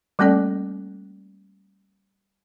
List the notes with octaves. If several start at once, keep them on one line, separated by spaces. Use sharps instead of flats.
G3 A3 A#3 C#4 A4 D5